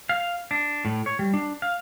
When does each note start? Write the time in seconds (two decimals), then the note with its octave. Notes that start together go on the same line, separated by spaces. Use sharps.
0.09 F5
0.51 D4
0.85 A2
1.06 C#5
1.19 G3
1.34 D4
1.62 F5